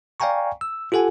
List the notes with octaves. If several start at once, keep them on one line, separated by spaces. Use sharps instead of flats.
D5 F5 G5 G#5 A#5 C#6
E6
F4 G4 A4 F#5 G#5